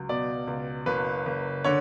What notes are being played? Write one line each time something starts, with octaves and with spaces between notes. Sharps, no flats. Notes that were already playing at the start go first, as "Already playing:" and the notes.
Already playing: C#2 F#3
B2 D5
C#2
F#1 B4
F#1
D3 C#5